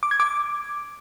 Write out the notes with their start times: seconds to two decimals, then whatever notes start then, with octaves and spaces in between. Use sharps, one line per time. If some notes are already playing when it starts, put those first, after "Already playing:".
0.03 D6
0.11 G#6
0.20 D6